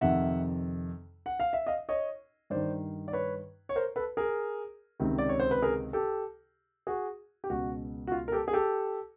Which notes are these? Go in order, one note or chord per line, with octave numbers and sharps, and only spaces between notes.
F2 C3 D#3 E5 F#5
F#5
F5
E5
D#5 F5
C#5 D#5
G2 D#3 C5 D5
D5
B4 C#5
C#5
A#4 C5
A4 B4
G#4 A#4
C#2 C3 D#3
D5
C#5
C5
B4
G#4 A#4
G4 A4
F#4 G#4
G4
C#2 B2 F#4
F#4
F4
A#4
G4 A4
G#4
G4 A4